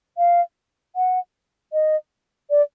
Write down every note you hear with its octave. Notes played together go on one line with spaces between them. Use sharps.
F5
F#5
D#5
D5